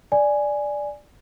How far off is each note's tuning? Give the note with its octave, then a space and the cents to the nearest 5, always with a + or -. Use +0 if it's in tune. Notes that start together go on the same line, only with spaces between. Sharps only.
D5 +0 G#5 +0